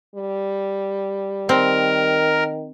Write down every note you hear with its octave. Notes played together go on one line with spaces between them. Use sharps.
G3
D#3 C4 A#4